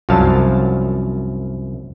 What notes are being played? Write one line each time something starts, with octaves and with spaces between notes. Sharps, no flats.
C2 F#2 F3 F#3 F5 A5